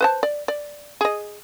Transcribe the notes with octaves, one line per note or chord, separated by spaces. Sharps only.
B4 C5 A5
D5
D5
G#4 D#5